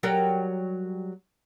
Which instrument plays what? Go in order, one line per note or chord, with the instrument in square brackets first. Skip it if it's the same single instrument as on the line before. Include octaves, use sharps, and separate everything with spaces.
[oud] F#3 G3 A#4